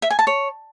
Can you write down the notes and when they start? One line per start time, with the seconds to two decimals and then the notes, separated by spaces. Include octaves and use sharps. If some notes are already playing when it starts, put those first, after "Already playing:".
0.02 E5
0.11 G#5
0.19 A5
0.27 C#5